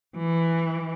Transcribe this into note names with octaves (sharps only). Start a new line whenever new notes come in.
E3